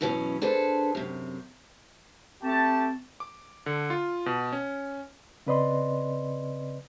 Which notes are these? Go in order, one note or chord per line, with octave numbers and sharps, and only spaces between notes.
F#2 B2 E3 F#3 C#4
D4 G#4 A4 B4 C5
F#2 C3
A3 C4 G4 A5
D6
D3
F4
B2
C#4
C#3 C4 B4 D5 D#5 C6